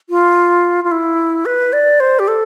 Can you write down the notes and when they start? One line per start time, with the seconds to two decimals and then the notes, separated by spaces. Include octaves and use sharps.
0.10 F4
0.84 F4
0.91 E4
1.45 B4
1.73 D5
2.00 C5
2.19 G4
2.28 A4